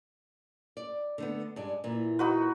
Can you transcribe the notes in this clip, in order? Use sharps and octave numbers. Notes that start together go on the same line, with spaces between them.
D5
D3 A3 B3
G2 G#3 D5
A#2 E3
D#4 F#4 B4